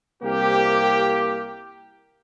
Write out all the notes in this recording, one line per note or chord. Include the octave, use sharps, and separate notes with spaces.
C2 A#3 G4